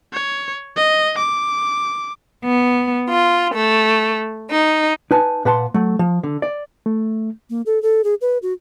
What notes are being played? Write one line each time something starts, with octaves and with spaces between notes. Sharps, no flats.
C#5
D#5
D6
B3
F4
A3
D#4
D#4 B4 G#5 A5
A#2 B4 F#5 A5 C6
F#3 A3
F3
D3
D5
A3
A#3
A4
A4
G#4
B4
F#4